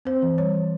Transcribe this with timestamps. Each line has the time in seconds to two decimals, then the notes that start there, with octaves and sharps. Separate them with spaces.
0.05 C4 C5
0.22 E3
0.38 G3 C#5
0.54 E3